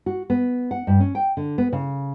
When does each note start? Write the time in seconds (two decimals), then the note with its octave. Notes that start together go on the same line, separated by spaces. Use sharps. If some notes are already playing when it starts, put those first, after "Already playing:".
0.06 F#4
0.30 B3
0.71 F#5
0.87 G2
1.00 C#4
1.15 G5
1.37 D3
1.58 B3
1.72 C#3